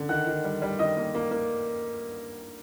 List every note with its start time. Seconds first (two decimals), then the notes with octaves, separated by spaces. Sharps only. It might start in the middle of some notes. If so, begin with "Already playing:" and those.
Already playing: D3
0.09 D#3 F#5 F#6
0.27 D#3
0.44 G3
0.62 G3
0.79 D#3 D#5 D#6
0.97 A#3
1.15 A#3
1.31 A#3